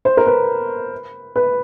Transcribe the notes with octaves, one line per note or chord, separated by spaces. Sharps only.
C5
A#4
B4
B4